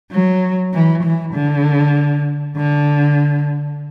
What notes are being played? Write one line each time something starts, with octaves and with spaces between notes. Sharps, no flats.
F#3
E3
E3
D3
D3